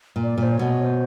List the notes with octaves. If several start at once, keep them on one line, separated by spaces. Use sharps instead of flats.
A#2
D5
A#2
C5
C#5
B2
C5